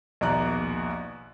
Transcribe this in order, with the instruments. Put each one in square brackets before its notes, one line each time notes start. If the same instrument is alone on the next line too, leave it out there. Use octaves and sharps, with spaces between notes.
[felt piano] A#1 D#2 B2 D5 A#5 F#6